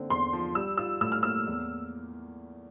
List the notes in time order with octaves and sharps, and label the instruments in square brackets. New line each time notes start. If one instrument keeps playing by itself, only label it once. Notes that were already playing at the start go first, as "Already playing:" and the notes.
Already playing: [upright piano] D3 A#3 C4
[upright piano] E2 [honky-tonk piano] C6
[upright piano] F3
[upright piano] G3 [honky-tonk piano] E6
[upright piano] F4 [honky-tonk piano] E6
[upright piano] A2 [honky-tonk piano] E6
[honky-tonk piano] F6
[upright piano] A#3 [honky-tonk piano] E6
[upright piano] E2